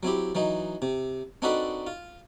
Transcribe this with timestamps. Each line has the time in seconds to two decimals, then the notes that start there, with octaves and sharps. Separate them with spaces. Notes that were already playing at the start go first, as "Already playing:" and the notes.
0.03 F#3 C4 E4 G4
0.35 E3 F#3 D#4
0.82 C3
1.42 C4 D4 D#4 F#4 A4 B4
1.87 F4